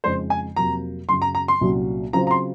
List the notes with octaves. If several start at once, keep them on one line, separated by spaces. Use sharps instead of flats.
F2 C#3 G#3 D#4 C5
G#5
F2 C3 F#3 A#3 A#5
F#2 C#3 F#3 C6
A#5
A#5
C6
C2 A#2 F#3 C#4 F#4
C#3 F#3 C4 F4 C5 A#5
A#5
C6